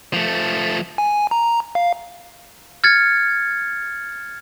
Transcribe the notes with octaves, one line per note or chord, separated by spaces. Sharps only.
F3 A3
G#5
A#5
F5
F6 G#6 A6 C#7